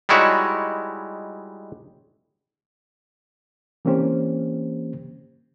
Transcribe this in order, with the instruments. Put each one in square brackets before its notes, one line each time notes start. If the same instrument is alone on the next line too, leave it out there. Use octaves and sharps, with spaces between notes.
[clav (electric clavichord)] G3 G#3 D#4 E4 F#4 C#5
[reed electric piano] E3 A#3 C4 C#4 G4 C5